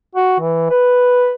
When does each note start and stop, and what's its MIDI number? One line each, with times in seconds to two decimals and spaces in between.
0.15 0.37 66
0.40 0.66 52
0.70 1.33 71